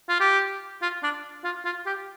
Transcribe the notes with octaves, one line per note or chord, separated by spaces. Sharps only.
F4
G4
F4
D4
F4
F4
G4